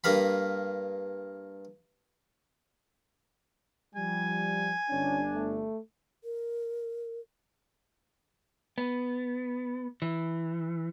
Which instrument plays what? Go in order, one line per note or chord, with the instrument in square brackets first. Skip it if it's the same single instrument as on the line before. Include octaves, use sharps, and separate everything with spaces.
[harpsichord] G2 A#3 F5 B5
[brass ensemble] F3 G3 [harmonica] G#5
[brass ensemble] G1 D4 [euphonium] C#4
[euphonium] A3
[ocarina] A#4
[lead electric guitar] B3
E3